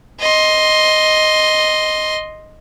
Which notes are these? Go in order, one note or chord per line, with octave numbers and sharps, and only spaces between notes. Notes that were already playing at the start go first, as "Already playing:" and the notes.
D#5 C6